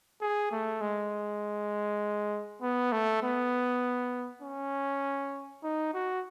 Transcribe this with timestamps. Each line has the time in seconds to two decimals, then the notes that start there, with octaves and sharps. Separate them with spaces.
0.21 G#4
0.52 A3
0.81 G#3
2.62 B3
2.92 A3
3.23 B3
4.42 C#4
5.63 D#4
5.94 F#4